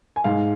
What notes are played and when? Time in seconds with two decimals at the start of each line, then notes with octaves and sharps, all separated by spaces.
0.16 G#5
0.24 G#2 F5